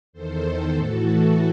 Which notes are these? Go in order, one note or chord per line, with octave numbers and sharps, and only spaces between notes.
E2 D#3 A4 C5
A4 C5
A2 E3 F#4 A4